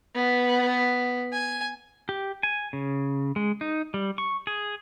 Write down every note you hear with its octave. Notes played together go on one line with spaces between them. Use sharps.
B3
G#5
G4
G#5
C#3
G#3
D#4
G3
C#6
G#4